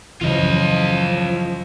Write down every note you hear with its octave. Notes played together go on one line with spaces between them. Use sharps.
F#2 C#3 E3 F3 F4 D#5